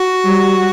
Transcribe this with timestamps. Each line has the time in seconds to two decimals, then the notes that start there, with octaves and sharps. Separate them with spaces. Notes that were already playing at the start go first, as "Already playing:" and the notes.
Already playing: F#4
0.25 G3